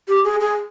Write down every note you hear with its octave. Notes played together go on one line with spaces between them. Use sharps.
G4
G#4
G#4